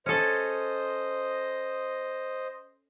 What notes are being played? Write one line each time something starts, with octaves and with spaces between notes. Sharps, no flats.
C#4 A4 C5 D#5